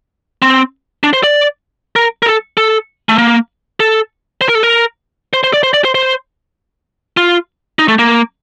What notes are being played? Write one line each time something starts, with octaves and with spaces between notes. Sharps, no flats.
C4
D4
C5
D5
A#4
A#4
A4
A4
A3
A#3
A4
C5
A#4
A4
A#4
C5
C5
D5
C5
D5
C5
C5
F4
D#4
A3
A#3